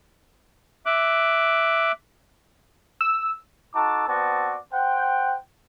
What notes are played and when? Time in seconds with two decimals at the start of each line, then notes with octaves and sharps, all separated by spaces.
0.86 E5 D6 F#6
3.01 E6
3.75 D#4 F#4 A4 A5 D6
4.07 B3 C4 F#4 D5 A5
4.73 C5 F#5 G5